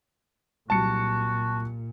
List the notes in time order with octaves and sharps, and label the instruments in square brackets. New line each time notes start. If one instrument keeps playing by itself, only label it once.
[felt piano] C2 F#3 [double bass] A#2 [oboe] F#4 [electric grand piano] A5 C#7